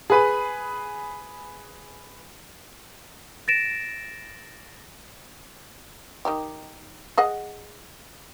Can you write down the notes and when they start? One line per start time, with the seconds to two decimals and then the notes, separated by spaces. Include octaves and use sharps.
0.10 G#4 B4 B5
3.48 A6 A#6 D7 E7
6.25 D#3 D#4 G4
7.18 G#4 D#5 F#5